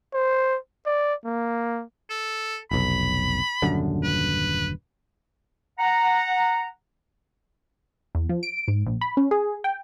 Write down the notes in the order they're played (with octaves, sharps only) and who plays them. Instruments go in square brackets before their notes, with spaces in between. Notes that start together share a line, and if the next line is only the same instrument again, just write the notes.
[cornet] C5
D5
A#3
[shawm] A4
[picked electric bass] F1 B1 [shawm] B5
[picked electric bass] D#1 F#2 D3
[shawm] B4
[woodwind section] F#5 A#5
[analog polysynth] E2
F3
D7
G#2
A#1
B5
C#4
G#4
G5